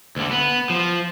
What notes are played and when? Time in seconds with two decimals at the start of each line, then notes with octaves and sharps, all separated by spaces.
0.16 D2 D3
0.31 B3
0.70 F3